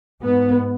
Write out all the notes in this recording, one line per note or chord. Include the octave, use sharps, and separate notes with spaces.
G#2 B3